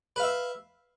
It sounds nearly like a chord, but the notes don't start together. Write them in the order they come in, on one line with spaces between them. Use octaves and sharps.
B4 F5 E5